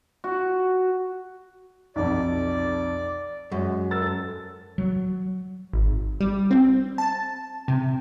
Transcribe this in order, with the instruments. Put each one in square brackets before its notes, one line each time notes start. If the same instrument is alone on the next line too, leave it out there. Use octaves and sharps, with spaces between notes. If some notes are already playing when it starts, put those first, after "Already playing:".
[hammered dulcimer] F#4
[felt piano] B1 F2 [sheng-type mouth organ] D5
[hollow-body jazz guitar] F#2 [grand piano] G#3
[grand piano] A#4 E6 A6
A4
[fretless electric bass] F#3
[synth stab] G#1
G3
C4
A5
C3